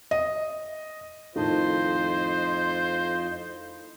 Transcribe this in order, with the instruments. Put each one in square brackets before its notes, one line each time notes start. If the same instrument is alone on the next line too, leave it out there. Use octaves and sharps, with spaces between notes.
[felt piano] D#5
[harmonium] F2 F4 D#5 [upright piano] A2 D#3 A5 [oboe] C5